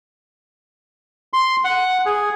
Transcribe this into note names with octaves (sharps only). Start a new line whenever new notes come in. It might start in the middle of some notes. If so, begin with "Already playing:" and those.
C6
F#5
G#4